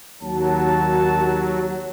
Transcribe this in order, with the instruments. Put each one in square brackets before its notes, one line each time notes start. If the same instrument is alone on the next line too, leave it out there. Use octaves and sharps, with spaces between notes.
[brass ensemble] D#2 F#4 A5 [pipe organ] F#3